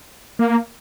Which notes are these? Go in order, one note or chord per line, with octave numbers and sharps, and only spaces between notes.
A#3